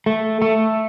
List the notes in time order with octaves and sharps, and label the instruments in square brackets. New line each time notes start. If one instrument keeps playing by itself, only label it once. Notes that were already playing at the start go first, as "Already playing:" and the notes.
[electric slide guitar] A3
A3